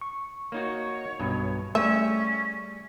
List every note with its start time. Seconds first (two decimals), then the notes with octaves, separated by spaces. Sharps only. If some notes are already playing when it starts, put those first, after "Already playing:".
0.01 C#6
0.52 A#3 D#4 F#4 C#5
1.20 B1 G2 B2
1.75 G3 A3 C#4 G#4 E5